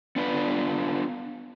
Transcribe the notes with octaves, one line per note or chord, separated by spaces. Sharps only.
B3 D4 F4 B4